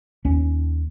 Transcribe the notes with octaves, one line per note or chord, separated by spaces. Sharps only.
D#2 C#4